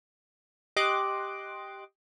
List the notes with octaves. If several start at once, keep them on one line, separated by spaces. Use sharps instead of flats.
G4 D#5 C6 D6 F#6